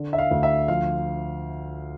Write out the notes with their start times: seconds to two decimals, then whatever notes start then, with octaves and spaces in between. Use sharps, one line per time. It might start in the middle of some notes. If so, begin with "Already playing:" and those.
Already playing: D3
0.13 E5
0.18 F5
0.31 D2
0.43 E5
0.68 F3 F5